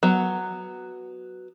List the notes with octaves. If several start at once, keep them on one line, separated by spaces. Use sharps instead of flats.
F#3 B3